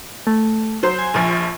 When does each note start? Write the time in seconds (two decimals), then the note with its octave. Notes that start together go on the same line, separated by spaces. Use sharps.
0.27 A3
0.83 F#3 C5
0.99 G#5
1.14 A#1 F3